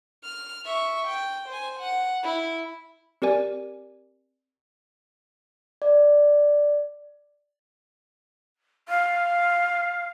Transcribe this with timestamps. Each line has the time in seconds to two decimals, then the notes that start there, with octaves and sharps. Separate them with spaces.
0.23 F6
0.65 E5 C#6
1.08 G5
1.49 C5 G#5
1.80 F#5
2.23 E4
3.22 C4 G4 A#4 D5 G#5
5.82 D5
8.89 F5